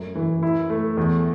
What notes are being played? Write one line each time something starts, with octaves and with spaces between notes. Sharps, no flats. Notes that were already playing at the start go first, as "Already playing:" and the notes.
Already playing: F#2 A3
E3
E4
A3
E2